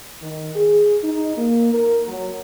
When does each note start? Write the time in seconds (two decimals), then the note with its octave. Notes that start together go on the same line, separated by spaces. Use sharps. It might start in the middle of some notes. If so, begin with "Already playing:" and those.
0.21 D#3
0.55 G#4
1.03 D#4
1.37 A#3
1.73 A#4
2.08 F#3